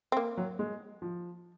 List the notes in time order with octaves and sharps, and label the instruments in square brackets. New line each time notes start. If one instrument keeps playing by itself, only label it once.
[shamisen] C4
A#3
[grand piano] F#3
G#3
F3